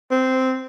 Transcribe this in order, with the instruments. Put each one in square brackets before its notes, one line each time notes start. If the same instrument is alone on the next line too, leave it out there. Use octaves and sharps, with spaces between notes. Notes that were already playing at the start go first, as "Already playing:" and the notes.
[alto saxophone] C4